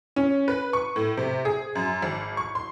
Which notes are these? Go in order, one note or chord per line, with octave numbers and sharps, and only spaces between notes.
C#4
B4
C#6
A2
C3
G#4
F#2
G#1
C#6
C6